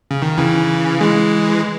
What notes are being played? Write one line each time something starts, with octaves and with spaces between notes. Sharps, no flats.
C#3
D#3
C#3 E3
E3 G#3